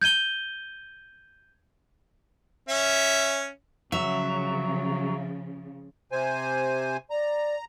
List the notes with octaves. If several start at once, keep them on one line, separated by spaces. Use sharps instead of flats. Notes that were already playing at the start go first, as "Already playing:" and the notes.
G6 G#6 D#7 G7
C#4 E5
C#3 F3 F#3 E5
C3 C5 G#5
D5 A#5